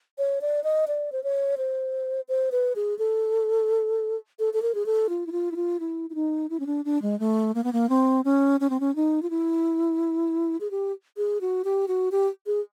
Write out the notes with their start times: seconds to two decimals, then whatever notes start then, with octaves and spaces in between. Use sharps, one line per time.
0.18 C#5
0.41 D5
0.64 D#5
0.88 D5
1.12 C5
1.24 C#5
1.58 C5
2.28 C5
2.52 B4
2.76 G#4
2.99 A4
4.39 A4
4.53 A4
4.62 A#4
4.74 G#4
4.86 A4
5.09 F4
5.26 E4
5.32 F4
5.51 E4
5.56 F4
5.80 E4
6.10 E4
6.15 D#4
6.50 E4
6.60 C#4
6.66 D4
6.85 D4
7.02 G#3
7.20 A3
7.55 A#3
7.64 B3
7.73 A#3
7.89 C4
8.25 C#4
8.60 C#4
8.70 C4
8.80 C#4
8.96 D#4
9.22 F4
9.30 E4
10.60 G#4
10.71 G4
11.17 G#4
11.41 F#4
11.64 G4
11.88 F#4
12.12 G4
12.46 G#4